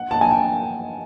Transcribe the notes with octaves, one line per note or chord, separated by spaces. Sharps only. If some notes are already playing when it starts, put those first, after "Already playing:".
Already playing: F#5
A5
G#5
G5